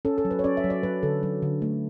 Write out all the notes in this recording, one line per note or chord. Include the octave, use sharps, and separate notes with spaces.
C#4 A4
A4
F#3
B4
C#5
C#4 D5
E5
F#3
D5
F#3 B4
D3 A4
F#3
D3
A3